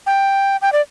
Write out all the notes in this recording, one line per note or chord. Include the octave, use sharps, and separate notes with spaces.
G5
G5
D5